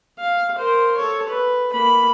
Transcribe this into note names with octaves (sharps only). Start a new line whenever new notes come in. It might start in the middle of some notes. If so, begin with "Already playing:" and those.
F5
A#4 C5
A4 C#5
B4
A#3 B5